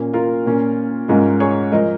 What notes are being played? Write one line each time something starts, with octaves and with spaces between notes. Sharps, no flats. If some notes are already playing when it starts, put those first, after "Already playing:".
Already playing: A#2 A#3 C#4
F4 A#4
A#2 A#3 C#4
G#2 G#3 C#4 F4 A#4
G#4 C#5
F3 G#3 A#4 D#5